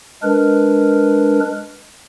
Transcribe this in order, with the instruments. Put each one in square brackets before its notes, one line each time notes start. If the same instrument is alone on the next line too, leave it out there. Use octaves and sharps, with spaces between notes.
[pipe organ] G#3 D4 A#4 B4